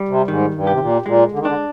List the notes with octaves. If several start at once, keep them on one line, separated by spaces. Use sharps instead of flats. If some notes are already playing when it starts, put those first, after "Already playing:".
Already playing: G3
C3
G#2 D#3
G2
C3 G4
A#2
G#2
A#2 G#3
D3
D#3
D3 D4